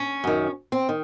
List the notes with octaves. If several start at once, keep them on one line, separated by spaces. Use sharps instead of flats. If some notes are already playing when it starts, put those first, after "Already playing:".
Already playing: C#4
F#2 D#3
C4
D#3